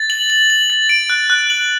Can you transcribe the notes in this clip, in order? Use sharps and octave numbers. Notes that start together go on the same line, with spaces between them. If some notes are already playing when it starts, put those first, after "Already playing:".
Already playing: A6
F#7
F#7
F#7
A6
D7
F#6
F#6
F#7